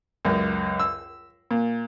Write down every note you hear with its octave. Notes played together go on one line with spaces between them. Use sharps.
C#2 F#2
E6
A#2